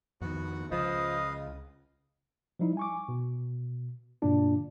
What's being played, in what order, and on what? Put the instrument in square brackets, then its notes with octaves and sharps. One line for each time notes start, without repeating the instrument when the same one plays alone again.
[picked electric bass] F2 D#3 [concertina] B3 F#4 F#5
[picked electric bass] C#2 C#3 [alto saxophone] F3 [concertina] B4 F5 D#6 [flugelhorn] D#5
[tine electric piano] F3 G3 D#4 E4
G#5 C#6 D6
B2
G2 B2 D3 A#3 D4 F4